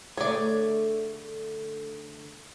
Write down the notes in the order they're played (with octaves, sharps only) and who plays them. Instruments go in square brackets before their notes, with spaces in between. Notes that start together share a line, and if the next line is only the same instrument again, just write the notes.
[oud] D3 A3 G#4 [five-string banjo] C#5 D5